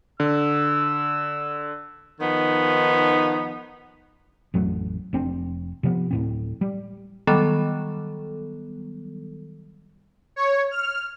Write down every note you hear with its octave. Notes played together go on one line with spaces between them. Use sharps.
D3 E6
D#3 F3 B3 D#4
A1 F2 F#3 A3
F1 C4 D4
C3 F3 G3 B3
D1 A2 C4
G3
D#3 F#3 G3 B3 A4
C#5
F6